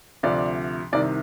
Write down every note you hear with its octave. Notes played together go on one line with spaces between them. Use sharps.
D2 C3 F3 D5
C2 C3 D#3 D5